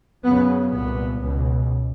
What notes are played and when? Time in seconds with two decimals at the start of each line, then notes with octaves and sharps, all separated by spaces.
0.24 F#2 C#3 B3
0.73 C2 A#2 B3
1.20 C#2 B2